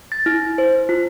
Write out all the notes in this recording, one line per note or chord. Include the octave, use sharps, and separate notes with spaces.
A6
E4
C5
F4